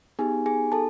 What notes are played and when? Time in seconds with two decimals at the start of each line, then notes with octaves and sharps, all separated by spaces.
0.19 B3 D#4 G4 G#4 G#5
0.46 G#4 G#5
0.72 A4 A5